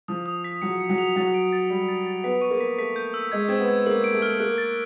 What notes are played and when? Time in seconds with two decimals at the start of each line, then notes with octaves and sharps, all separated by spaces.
0.08 F3 D#6
0.26 D#6
0.44 B6
0.62 F#3 C#7
0.81 C#7
0.89 F#3
0.98 F7
1.16 F#3 A6
1.34 D7
1.52 A6
1.70 G3 C#7
1.89 A6
2.06 A6
2.24 B3 B6
2.41 C#6
2.51 A#3
2.60 B6
2.78 A3 B6
2.96 G6
3.14 E6
3.32 G#3 G#6
3.48 C4 G#6
3.60 B3
3.68 G#6
3.86 A#3 F#7
4.04 D7
4.13 A3
4.22 F6
4.40 A#3 F#6
4.58 A6